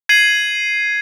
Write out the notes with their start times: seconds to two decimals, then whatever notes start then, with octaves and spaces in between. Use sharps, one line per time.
0.09 G#6 C7 D#7 F#7